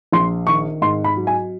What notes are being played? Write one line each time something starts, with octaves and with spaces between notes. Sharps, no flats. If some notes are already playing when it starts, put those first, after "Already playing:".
A#1 C6
D#3 C#6
G#2 C6
B5
F#3
G#5